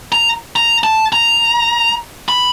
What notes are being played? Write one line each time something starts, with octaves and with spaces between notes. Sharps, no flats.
A#5
A#5
A5
A#5
B5